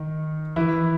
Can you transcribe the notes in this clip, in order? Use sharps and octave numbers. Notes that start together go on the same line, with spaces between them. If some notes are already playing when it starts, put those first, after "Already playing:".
Already playing: D#3 D#4
E3 E4